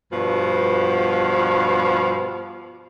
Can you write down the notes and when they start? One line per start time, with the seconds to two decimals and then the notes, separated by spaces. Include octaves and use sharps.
0.12 G2 B2 F3